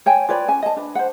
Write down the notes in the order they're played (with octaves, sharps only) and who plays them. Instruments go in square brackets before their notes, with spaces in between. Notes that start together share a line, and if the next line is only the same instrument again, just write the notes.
[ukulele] C#5 G5 G#5
F4 B4 C#5 D5
C#4 G#5
D#5 A5
D4 B4
C5 F#5